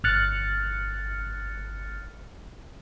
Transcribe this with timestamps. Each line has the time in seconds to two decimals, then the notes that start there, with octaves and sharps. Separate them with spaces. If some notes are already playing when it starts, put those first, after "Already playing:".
0.04 G1 F6 F#6 A6 C#7